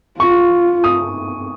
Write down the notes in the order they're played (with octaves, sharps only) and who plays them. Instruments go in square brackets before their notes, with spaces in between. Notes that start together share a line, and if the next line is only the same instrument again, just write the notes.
[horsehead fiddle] F4 [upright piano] C#6
[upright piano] D#6